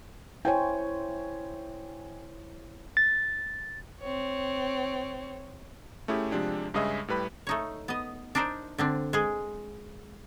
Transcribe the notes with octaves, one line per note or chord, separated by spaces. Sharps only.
E4 C5 C#5 G5 G#5
A6
C4 C#5
A3 C#4 E4 G4 G#4
C3 F3 G#3 D4 G4
G2 C#3 G#3 G#4 D#5 E5
A2 G3 B4 B5
A3 D#4 C#5
B3 D#5
D4 D#4 A#4 C5 D5
D3 C4 D4
G#3 G#4